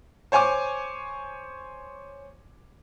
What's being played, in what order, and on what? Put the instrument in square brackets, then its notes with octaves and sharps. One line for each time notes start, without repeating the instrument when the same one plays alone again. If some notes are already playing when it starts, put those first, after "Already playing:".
[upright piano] C5 C#5 G#5 C#6 D6